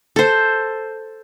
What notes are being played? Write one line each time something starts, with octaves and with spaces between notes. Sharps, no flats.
A4 C5